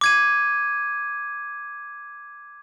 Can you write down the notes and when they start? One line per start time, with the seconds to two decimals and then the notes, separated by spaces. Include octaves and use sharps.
0.01 D6 G#6 D#7